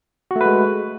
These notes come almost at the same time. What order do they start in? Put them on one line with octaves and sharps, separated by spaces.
F#4 A3 B4 G#3